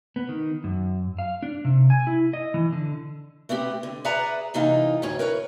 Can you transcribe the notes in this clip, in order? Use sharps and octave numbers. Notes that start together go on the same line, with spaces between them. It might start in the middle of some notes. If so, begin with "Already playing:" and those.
B3
D#3
F#2
F5
D4
C3
G#5
E4
D#5
E3
D3
A3 B3 C4 G4
D3
G#4 B4 D5 E5 F#5 A#5
C3 E3 A#3 D#4 F4
D2 A2 C#5 G#5
A#4 B4 C#5